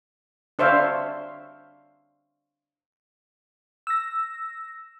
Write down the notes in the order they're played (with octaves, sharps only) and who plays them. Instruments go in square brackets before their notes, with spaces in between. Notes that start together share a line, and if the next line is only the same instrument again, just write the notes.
[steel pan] D4 C5 C#5 E5 F5
[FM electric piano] E6 A#6